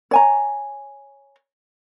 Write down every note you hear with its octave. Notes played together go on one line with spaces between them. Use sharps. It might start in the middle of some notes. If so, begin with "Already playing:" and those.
C#5 G#5 A#5